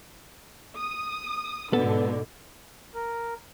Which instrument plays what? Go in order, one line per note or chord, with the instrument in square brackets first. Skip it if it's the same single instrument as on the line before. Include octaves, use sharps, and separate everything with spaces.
[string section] D#6
[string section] G#2 B2 D3 [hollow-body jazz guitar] B3 A4
[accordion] A#4